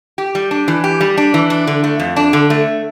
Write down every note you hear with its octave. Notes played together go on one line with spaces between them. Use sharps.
G4
G3
D4
E3
G4
G3
D4
E3
D4
D3
A3
F2
D4
D3
A3